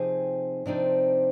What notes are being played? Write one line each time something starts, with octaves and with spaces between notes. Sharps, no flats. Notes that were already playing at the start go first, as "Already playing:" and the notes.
Already playing: C3 F3 C4 D#4 G#4 G#5
C3 F3 C4 D4 D#4 D5